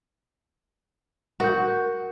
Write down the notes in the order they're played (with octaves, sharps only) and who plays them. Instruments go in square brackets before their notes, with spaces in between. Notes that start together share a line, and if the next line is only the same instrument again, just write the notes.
[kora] F#4 [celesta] A#4 G6